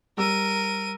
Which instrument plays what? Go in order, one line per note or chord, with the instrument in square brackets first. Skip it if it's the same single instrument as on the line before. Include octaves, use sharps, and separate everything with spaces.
[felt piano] G3 E6 [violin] A#4 D#7